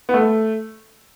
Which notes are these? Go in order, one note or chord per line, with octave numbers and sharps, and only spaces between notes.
B3
A3